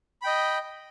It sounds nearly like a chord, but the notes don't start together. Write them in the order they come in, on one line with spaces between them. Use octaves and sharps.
B5 G5 D#5